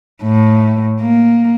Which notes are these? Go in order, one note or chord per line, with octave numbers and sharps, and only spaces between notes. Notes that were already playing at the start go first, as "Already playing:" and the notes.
A2
A#3